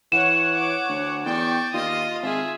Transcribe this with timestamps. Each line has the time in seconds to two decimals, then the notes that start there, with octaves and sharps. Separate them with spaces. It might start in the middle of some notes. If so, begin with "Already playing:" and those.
0.12 E3 C#5 F#5 E7
0.56 D6
0.89 D2
1.26 E2 D5 G5 C#6
1.73 D#2 F4 D#5 D#6
2.22 G#1 G#4 E5